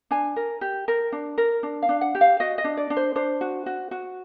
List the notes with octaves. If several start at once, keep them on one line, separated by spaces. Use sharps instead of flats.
D4 G#5
A#4
G4
A#4
D4
A#4
D4
F5
D4
F#5
G4
F5
F#4 D#5
D#5
D4
D5
D4
C5
D4 C5
F#4
F#4
F#4